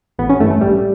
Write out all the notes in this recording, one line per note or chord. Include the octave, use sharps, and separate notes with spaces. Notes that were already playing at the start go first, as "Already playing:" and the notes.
A1 B3
C#4
G2 E3 A3
A3
A1 G3